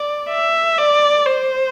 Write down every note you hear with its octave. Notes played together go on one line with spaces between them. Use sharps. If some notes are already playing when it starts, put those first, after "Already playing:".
Already playing: D5
E5
D5
C5